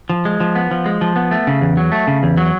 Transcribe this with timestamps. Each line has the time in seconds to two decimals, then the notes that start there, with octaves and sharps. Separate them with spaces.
0.09 F3
0.25 G#3
0.40 F3
0.55 B3
0.71 F3
0.86 G#3
1.01 F3
1.16 B3
1.31 A3
1.47 C#3
1.61 E2
1.77 F#3
1.92 A3
2.07 C#3
2.23 E2
2.37 F#3